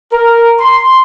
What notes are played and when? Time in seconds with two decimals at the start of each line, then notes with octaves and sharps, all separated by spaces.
0.13 A#4
0.60 C6